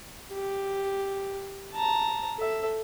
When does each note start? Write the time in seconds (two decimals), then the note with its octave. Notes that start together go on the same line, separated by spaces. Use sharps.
0.33 G4
1.73 A5 A#5
2.38 A4 E5